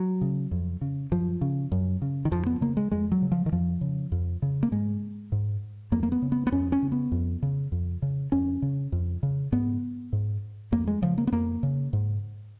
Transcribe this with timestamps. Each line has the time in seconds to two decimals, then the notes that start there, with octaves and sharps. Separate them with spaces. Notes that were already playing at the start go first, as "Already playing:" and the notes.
Already playing: F#3
0.21 C#3
0.51 F2
0.81 C#3
1.11 F#2 F3
1.41 C#3
1.72 F#2
2.02 C#3
2.25 D#3
2.32 F2 F3
2.46 B3
2.61 C#3 A#3
2.77 G#3
2.92 F2 G#3
3.12 F#3
3.22 C#3
3.32 F3
3.46 D#3
3.52 F2 F3
3.81 C#3
4.12 F2
4.42 C#3
4.63 A#3
4.72 G#2 G#3
5.32 G#2
5.92 F2 A#3
6.03 A#3
6.12 B3
6.22 C#3
6.32 B3
6.47 B3
6.52 F2 C#4
6.72 C#4
6.82 C#3
6.92 B3
7.12 F2
7.43 C#3
7.72 F2
8.02 C#3
8.32 F2 C#4
8.62 C#3
8.92 F2
9.23 C#3
9.52 G#2 B3
10.13 G#2
10.72 F2 A#3
10.87 G#3
11.02 C#3 F3
11.18 A#3
11.27 B3
11.32 F2 A#3
11.63 C#3
11.93 G#2